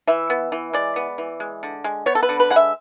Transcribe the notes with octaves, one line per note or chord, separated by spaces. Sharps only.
E3 E5
B3
E3
G#3 D5
B3
E3
G#3
D3
G#3
B3 C#5
A4
B4
D3
B4
G#3 F#5
E5